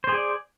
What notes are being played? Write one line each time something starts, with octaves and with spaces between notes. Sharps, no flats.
G#4 C5 D5